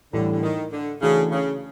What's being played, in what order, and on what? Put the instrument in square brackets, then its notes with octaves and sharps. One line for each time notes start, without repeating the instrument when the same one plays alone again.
[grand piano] A2 E3 G3 [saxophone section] D3
[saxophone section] D3
D#3
D3
[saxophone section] C#3 [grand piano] E3 A3 D4 F#4 A4
[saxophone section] C#3